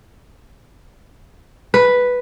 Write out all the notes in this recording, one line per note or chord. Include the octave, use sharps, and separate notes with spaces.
B4